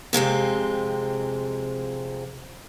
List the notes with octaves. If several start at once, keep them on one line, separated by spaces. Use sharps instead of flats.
F2 C3 G#3 C4